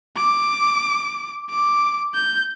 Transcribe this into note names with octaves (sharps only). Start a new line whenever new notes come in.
D6
D6
G6